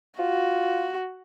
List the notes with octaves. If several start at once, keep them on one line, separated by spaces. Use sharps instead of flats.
F4 F#4